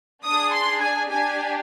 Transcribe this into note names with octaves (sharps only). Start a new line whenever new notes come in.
D4 G#4 D#6
C6
G#5
D4 G4 G#5